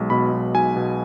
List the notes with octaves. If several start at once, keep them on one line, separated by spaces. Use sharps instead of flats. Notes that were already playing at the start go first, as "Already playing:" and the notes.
Already playing: B1 G#3
B2 B5
B1
B1 G#5
B2